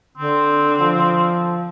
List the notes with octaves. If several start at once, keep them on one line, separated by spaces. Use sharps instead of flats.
D3 C4
F3